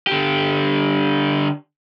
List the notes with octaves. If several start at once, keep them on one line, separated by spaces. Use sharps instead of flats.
D3 G4